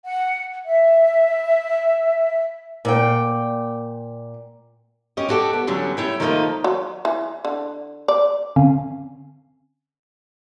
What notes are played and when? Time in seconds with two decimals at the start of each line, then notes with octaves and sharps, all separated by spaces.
0.05 F#5
0.65 E5
2.85 A#2 G5
5.17 C#4 G4 D#5
5.28 E4 F#4 G4 A4 D5
5.53 B3
5.67 E2 D3 F#3 G3 C#4
5.97 A3 E4 C#5 G5
6.20 D#3 F3 A3 A#3 F4 D#5
6.64 F#3
7.05 E3
7.45 D3
8.08 D5
8.56 D3 C4 C#4 F5 G#5